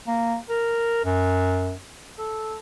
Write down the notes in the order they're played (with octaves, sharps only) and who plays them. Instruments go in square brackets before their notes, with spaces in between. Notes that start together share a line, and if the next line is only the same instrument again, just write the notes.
[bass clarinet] A#3
A#4
F#2
A4